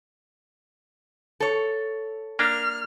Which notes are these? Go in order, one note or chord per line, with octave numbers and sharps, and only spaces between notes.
A4 C#5
A#3 D4 F6